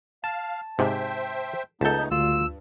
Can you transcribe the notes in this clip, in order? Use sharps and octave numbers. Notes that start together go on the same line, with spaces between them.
F5 A5
G#2 C3 C5 E5 G5
C#2 A3 B3 D#4 A4 A5 G6
D2 G2 F4 E6